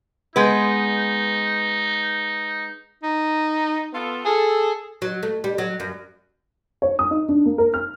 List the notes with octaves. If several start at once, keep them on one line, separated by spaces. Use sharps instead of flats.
G#3 B3 D#4 B4
D#4
B3 F4 A4
G#4 A4
F#3
A3
G3
F#3
F#2
C#5
D#6
D#4
D4
A#3
A#4
F6